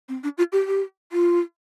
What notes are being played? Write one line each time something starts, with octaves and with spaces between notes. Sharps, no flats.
C4
D4
F4
G4
G4
F4